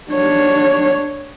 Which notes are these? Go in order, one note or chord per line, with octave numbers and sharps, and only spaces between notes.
D4 C#5